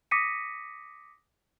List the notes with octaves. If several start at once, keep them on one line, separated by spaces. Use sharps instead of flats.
D6 D#6 A#6 B6 C#7 D#7